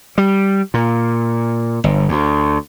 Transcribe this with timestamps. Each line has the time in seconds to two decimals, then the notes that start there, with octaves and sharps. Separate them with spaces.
0.18 G3
0.74 A#2
1.84 G1
2.09 D2